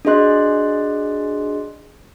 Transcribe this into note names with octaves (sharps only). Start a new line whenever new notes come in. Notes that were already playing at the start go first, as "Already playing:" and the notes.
D4 F#4 G#4 D#5 C6 F#6